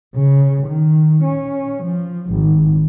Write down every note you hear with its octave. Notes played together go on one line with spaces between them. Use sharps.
C#3
D#3
C#4
F3
G#1